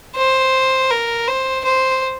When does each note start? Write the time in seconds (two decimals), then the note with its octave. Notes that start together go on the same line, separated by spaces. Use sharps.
0.16 C5
0.90 A#4
1.27 C5
1.64 C5